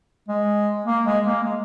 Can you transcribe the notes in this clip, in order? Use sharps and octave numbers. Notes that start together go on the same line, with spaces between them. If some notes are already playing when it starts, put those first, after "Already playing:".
G#3
A#3
G#3
A#3
G#3